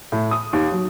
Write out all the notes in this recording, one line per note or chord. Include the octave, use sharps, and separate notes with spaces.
A2
D#6
D#2
F#3